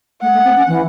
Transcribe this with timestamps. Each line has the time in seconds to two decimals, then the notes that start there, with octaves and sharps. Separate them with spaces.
0.22 A3 F#5
0.34 A3
0.45 C4
0.57 C#4
0.68 E3